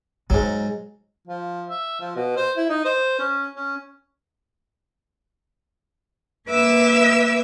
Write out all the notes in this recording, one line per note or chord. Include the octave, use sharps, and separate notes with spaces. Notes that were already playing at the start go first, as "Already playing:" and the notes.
G#2 F#3 G#3
F3
E5
F3
B2
C5
E4
D#4
C5
C#4
C#4
A#3 B4 E5 D6 E6